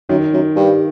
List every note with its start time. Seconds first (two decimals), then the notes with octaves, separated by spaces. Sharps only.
0.09 F#2 D#3
0.33 F#2
0.56 G2